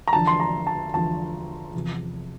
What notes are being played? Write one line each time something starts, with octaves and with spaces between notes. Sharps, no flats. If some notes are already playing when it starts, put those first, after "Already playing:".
A#5
E2 D3 F3 A5
C6
A#5
A5
E2 D3 F3 A5
E2 C3 F3